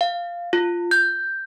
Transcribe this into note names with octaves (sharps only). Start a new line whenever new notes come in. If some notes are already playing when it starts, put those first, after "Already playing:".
F5
F4
G6